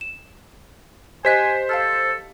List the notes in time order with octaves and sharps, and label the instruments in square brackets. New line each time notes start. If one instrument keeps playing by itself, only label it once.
[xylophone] E7
[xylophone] G4 D#5 F#6 [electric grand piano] C5 B6 [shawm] G#5
[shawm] A4 [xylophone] F5 A5 F6